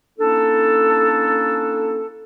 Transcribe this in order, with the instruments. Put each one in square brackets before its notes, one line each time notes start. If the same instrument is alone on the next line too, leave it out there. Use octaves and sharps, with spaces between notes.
[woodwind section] A#3 C#4 D4 E4 A4